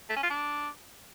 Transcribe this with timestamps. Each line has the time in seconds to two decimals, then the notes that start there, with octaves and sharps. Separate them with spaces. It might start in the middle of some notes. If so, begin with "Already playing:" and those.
0.10 A3
0.17 C#4
0.23 F4
0.30 D4